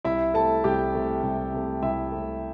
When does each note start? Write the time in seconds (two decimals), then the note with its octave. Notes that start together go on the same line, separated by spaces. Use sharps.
0.05 C2 E4 E5
0.34 C3 A3 A4 A5
0.64 C2 G4 G5
0.94 C3 A3
1.23 C2
1.53 C3 A3
1.82 C2 E4 E5
2.12 C3 A3